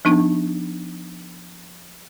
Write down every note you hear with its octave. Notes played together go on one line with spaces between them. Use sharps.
F3 B3 D4 D#4